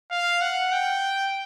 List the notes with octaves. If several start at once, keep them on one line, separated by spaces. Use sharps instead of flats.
F5
F#5
G5